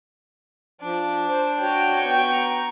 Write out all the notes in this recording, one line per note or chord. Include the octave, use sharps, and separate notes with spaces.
F3 D4
C5
F#4 C#5 G5
B3 C#6
A#5